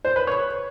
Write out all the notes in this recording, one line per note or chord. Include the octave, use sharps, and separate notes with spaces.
C5
B4
C#5